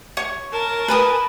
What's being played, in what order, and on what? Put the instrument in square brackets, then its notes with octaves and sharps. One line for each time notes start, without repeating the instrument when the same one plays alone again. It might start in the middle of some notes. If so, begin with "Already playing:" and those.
[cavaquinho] C#5 C#6
[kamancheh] A#4 A5
[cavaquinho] B4 G#5 D#6